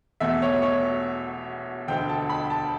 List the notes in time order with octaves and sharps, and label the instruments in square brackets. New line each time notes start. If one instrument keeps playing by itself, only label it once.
[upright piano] E1 E2 B2 A3 E5
C#5
C#5
E1 D2 D3 G5
A5
B5
A5